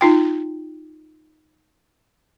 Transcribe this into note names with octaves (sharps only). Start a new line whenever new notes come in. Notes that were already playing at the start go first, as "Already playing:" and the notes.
D#4 F4 G5